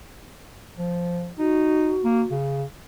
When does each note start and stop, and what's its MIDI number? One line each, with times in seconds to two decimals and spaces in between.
0.79 1.30 53
1.39 1.95 63
1.39 2.33 66
2.04 2.23 58
2.31 2.64 49